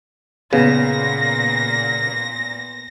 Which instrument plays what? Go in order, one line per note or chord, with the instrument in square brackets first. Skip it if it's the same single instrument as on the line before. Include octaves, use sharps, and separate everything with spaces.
[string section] A#2 [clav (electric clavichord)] C#3 [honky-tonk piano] B3 [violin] A#6